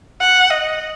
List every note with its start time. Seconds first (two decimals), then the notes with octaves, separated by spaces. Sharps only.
0.21 F#5
0.50 D#5